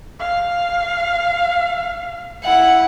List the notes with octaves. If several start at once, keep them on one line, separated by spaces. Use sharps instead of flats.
F5
E4 F#5